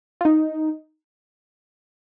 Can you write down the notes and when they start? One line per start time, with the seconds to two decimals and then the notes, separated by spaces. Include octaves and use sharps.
0.21 F4
0.25 D#4